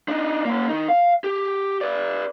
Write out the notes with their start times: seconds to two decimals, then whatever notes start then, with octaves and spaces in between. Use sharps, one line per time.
0.08 D4 D#4
0.45 A#3 C#4
0.69 D#3 D#4
0.89 F5
1.24 G4
1.81 B4 D5